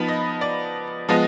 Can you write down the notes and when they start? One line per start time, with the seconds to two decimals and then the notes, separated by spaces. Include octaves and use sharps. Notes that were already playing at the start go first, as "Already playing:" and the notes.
Already playing: F3 B3 D#4 B5
0.08 D#5
0.41 D5
1.09 F3 G#3 B3 D#5